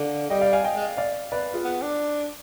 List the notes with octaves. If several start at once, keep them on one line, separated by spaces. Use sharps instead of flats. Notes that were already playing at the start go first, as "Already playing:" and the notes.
Already playing: D3 F5
G3 D#5 G5
D5 F5
F5 G#5
D#5 G5
G#3
D5 F5
B4 D5
F4 G#4
B3
D4